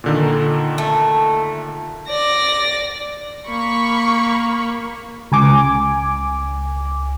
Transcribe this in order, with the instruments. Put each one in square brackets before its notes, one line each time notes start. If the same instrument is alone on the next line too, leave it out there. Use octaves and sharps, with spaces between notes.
[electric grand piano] A#2 D3 D#3
[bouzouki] A3
[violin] D5 A#6
[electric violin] A#3 [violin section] B5 C#6
[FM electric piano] C#2 G#5 D6